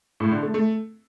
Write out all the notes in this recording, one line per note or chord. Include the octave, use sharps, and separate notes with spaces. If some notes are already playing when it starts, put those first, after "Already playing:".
A2
D3
A3
A3